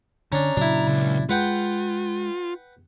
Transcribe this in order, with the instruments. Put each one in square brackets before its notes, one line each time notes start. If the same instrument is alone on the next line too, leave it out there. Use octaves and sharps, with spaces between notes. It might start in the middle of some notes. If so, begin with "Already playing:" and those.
[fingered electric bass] D3 [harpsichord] C#4 D4 [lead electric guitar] A#5
[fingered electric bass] A#2 C#3 F#3 [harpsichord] D4 E4
[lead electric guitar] C#2
[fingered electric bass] G#3 [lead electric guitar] F4 [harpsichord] B4 F#5 G5